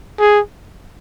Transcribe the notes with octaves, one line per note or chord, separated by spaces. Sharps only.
G#4